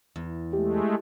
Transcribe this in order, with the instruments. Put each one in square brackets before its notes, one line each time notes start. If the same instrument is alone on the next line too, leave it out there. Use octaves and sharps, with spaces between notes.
[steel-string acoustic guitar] E2
[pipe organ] G#3 A3 [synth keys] G4